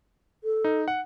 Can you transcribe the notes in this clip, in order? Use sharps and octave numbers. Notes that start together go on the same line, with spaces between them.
A4
D#4
F#5